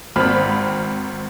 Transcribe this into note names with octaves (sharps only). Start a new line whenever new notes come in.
G#1 C4 B5 F6